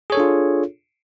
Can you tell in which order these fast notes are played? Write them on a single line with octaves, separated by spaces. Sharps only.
G#4 C#5 A4 D4 F4